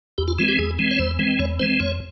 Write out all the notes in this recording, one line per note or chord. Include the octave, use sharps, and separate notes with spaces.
E2 G4
F4
E3 G#3 C4 F4
G4
E2 G#4
E3 G#3 C4
C#5
E2 C5
E3 G#3 C4
E2 C#5
E3 G#3 C4 C5
F2 C#5